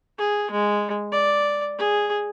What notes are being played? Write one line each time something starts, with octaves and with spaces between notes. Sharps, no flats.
G#4
G#3
D5
G#4